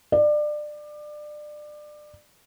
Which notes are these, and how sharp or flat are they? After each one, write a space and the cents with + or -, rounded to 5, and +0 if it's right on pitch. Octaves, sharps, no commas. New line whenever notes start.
D5 +25